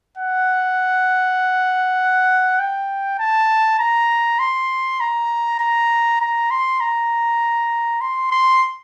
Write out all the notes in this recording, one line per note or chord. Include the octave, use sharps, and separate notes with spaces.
F#5
G5
A5
A#5
C6
A#5
A#5
A#5
C6
A#5
C6
C6